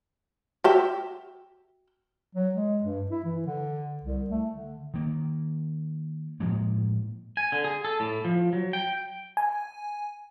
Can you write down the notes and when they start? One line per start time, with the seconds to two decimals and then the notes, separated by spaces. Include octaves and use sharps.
0.64 F#4 G4 E5
2.35 F#3
2.55 G#3
2.83 G2
3.11 E4
3.24 E3
3.46 D3
4.03 C2
4.30 A3
4.51 D3
4.94 D#3 A#3
6.40 A2 F3 G#3 A#3
7.37 G#5
7.52 D3
7.64 G#4
7.84 A4
8.00 A2
8.25 F3
8.53 F#3
8.73 G5
9.37 G#5